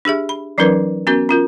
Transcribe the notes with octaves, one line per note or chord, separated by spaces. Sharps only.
D4 G4 G#4 E5
B5
E3 F#3 C#4 D#4 A#4 B4
B3 C#4 F#4 A#4
C#4 F4 A#4